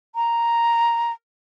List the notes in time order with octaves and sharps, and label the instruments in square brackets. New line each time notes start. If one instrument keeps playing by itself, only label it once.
[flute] A#5